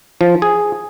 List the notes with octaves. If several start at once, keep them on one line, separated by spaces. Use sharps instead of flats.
F3
G#4